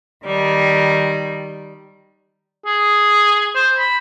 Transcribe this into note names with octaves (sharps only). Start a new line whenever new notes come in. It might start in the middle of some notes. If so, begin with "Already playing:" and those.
D#3 G3
G#4
C5
B5